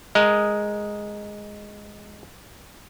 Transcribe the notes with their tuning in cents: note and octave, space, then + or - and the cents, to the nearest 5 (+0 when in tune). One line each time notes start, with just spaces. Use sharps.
G#3 +0 A#4 +0 D#5 +0